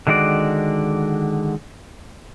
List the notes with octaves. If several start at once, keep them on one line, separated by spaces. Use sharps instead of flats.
D3 D#3 G#3 F#4 D5